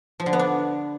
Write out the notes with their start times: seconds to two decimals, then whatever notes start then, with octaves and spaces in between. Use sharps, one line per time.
0.20 F3
0.26 D3
0.33 B3
0.39 D4